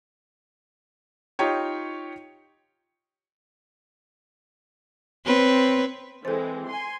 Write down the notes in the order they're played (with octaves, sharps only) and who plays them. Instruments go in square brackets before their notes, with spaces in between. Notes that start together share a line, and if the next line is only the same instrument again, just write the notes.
[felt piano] D#4 F4 G4 C#5
[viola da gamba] C4 B4 C#5
[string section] E3 G#3 [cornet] C4 [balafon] A4 C5
[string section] G#5 C6